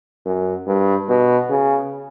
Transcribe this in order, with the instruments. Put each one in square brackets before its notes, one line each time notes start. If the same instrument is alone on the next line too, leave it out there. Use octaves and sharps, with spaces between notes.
[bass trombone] F#2
G2
B2
C#3